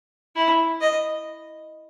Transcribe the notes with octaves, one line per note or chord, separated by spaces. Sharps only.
E4
D#5